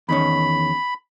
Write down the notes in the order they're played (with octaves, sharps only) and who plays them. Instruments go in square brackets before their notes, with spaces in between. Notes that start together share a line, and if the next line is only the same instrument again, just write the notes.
[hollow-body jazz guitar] E2 D#3 C#4 [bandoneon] B5